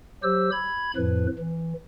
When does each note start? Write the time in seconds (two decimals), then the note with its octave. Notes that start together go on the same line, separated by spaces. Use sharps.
0.23 F#3 G4 C5 E6
0.52 B5 G#6
0.96 F2 A2 F3 B4
1.39 E3